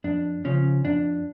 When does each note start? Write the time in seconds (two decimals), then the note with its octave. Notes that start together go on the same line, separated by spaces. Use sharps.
0.04 F2 D4
0.44 C#3 F3 C#4
0.85 F2 D4